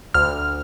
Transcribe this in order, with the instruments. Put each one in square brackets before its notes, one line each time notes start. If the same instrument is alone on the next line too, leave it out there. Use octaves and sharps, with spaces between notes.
[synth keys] D2 F6